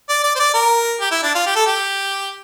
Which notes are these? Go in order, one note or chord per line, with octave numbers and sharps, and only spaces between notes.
D5
D5
C5
D5
A#4
G4
E4
D4
F4
G4
A4
G4